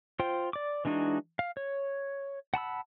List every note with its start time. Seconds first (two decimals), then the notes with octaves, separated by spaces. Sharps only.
0.19 F4 C5 G5
0.53 D5 D6
0.85 E3 G#3 D4 D#4 F#4
1.39 F5
1.57 C#5
2.54 F#5 A5 B5 E6